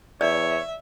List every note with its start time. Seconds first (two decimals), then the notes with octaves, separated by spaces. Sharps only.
0.21 E2 C#5 D5 E5